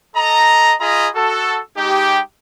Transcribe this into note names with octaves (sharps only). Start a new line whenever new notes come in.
A4 D#5 A#5
F4 G#4 D#5 A#5 B5
F#4 A4
G#3 D#4 G4